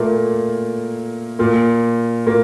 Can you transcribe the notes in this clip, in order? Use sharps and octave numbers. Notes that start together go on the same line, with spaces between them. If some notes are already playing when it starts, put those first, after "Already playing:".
Already playing: A#2 A3 A#3
A#2 A#3
A#2 A#3